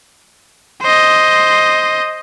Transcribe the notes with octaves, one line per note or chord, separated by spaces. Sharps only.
C5 D#5